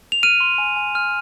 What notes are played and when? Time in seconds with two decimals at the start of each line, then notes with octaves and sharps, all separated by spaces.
0.12 F7
0.23 F6 D#7
0.40 C6
0.58 G#5
0.77 G#5
0.95 F6